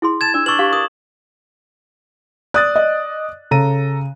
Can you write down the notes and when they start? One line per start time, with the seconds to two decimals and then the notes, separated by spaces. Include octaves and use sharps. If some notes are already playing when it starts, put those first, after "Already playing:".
0.02 E4 G#4 C6
0.21 A5 G#6 E7
0.34 D4 D5 E6
0.46 D4 B4 C#6 E6 F#7
0.59 G4 D5 F5
0.73 A#4 D#6
2.54 D5 D#6 F#6 A6
2.76 D#5
3.51 C#3 A4 A#5 D#7